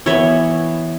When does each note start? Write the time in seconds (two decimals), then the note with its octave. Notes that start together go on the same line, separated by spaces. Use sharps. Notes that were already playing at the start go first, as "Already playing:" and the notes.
0.06 E3 B3 C#5 E5